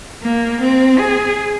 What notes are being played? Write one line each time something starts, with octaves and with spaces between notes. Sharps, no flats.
A#3
C4
G#4